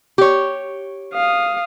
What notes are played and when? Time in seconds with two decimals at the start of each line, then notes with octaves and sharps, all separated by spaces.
0.18 G4 C#5
1.14 F5 D#6